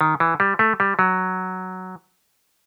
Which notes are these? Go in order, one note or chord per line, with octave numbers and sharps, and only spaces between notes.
D#3
E3
G3
A3
G3
F#3